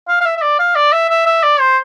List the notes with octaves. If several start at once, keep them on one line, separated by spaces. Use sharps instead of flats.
F5
F5
E5
E5
D5
F5
D5
E5
E5
E5
D5
C5